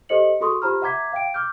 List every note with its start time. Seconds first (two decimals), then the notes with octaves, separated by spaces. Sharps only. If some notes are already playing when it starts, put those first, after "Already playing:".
0.09 G4 A4 C5 D#5 C#7 F#7
0.41 F#4 G#4 A4 C6 C#6 D#6
0.62 F4 G4 C5 A#5 B5 F6
0.82 E5 F#5 A#5 D6 G#6 B6
1.12 F5 G5 D7
1.34 D6 F6 G6